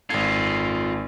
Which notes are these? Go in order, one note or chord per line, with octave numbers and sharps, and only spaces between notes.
G#1 F4 A4 G#6